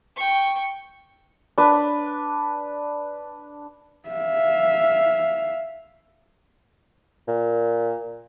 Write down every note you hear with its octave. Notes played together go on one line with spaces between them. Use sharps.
G5 C#6
D4 B4
E5 F5
A#2